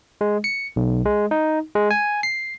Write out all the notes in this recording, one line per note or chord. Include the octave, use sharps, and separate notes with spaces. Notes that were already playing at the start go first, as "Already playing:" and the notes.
G#3
C#7
B1
G#3
D#4
G#3
G#5
C7